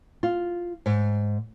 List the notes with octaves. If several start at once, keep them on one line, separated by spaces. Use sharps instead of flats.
F4
G#2